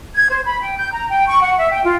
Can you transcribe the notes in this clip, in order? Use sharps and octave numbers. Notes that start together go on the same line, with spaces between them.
G#6
C5
B5
G5
G6
A#5
G5
C#6
F#5
E5
G5
F4